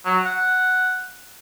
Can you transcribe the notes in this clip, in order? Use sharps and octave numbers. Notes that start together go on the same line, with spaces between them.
F#3
F#5